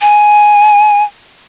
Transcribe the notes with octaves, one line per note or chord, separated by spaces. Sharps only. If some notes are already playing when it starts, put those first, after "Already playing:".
G#5